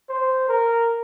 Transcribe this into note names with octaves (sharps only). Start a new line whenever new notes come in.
C5
A#4